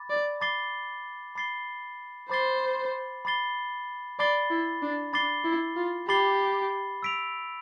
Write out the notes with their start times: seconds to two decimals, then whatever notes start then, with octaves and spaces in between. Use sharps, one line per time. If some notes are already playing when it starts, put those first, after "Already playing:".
Already playing: B5 D6 A6
0.10 D5
0.40 B5 D6 A6 C7 G7
1.35 B5 D6 A6 C7 G7
2.29 C5 B5 D6 A6 C7 G7
3.25 B5 D6 A6 C7 G7
4.19 D5 B5 D6 A6 C7 G7
4.51 E4
4.82 D4
5.13 D4 B5 D6 A6 C7 G7
5.45 E4
5.76 F4
6.07 G4 B5 D6 A6 C7 G7
7.03 E6 B6 D7 F7